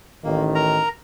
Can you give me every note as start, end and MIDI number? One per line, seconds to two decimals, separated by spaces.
0.24 0.81 33
0.24 0.81 51
0.24 0.43 58
0.55 0.89 70
0.55 0.89 82